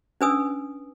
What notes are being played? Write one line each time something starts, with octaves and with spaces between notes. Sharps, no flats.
C#4 D4 B4 G#5 D#6 E6